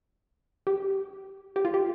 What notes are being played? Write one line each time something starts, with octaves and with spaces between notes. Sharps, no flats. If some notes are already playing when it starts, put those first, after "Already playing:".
G4
G4
F4
G4